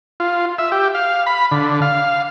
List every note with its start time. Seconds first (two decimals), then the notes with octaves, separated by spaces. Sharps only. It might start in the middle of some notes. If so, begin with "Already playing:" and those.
0.20 F4
0.59 E5
0.72 G4
0.94 F5
1.26 B5
1.51 D3
1.82 F5